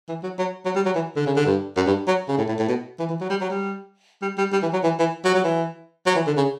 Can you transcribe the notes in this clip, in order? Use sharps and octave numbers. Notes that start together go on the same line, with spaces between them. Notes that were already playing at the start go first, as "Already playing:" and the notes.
E3
F#3
F#3
F#3
G3
F#3
E3
D3
C#3
D3
G2
F#2
G2
F#3
C#3
A2
A2
A2
B2
E3
E3
F#3
G3
F#3
G3
G3
G3
G3
E3
F#3
E3
E3
F#3
F#3
E3
F#3
E3
D3
C#3